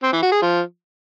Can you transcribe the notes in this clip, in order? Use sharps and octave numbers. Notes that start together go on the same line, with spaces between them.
C4
E3
F#4
G#4
F3